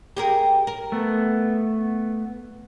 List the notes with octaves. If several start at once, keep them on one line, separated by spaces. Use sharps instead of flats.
G4 G#4 A#4
A#4
A3 B3